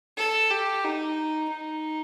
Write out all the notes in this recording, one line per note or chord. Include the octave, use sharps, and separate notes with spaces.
A4
G4
D#4
D#4